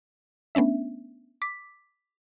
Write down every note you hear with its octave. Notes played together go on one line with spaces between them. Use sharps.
A3 B3 C#4 D4 E5
D6 B6